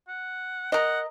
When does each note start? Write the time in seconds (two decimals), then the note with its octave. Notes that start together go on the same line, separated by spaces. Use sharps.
0.08 F#5
0.72 A#4 D#5 F#5